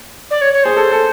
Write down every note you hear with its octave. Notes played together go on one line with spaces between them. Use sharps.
D5
C#5
C#5
G#4 C5
A4
A4